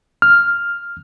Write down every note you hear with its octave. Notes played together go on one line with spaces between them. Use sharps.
F6